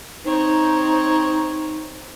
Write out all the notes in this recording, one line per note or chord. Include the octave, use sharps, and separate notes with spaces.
C4 D#4 C#5